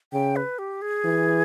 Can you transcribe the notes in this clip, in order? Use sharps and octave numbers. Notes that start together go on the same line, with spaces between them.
C#3 G5
B4
G4
G#4
E3